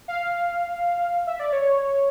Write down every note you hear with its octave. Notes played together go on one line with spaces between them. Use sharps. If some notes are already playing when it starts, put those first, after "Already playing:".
F5
E5
D5
C#5
C#5